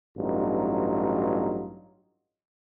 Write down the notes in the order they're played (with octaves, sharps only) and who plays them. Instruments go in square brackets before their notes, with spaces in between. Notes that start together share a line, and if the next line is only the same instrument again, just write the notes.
[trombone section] A1 G2 F#3 D#4 F4